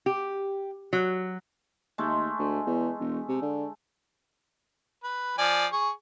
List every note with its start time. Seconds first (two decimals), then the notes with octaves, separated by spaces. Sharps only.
0.06 G4
0.93 F#3
1.98 D#2 G#3 A3
2.39 D2
2.67 E2
3.00 E1
3.29 C3
3.42 D3
5.03 B4
5.38 F3 D5 G#5
5.73 G#4 C#6